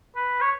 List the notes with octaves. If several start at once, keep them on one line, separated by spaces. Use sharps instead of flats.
B4
C#5